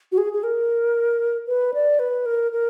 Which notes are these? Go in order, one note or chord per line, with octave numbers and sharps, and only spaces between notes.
F#4
G#4
G#4
A#4
B4
D5
B4
A#4
A#4